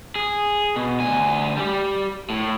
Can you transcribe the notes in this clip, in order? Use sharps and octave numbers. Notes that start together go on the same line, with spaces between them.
G#4
B2
D2 G#5
G3 G4
A2